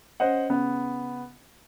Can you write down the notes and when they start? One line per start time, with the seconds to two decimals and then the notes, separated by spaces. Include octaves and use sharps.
0.20 C#4 C5 D#5 F#5
0.49 C#3 B3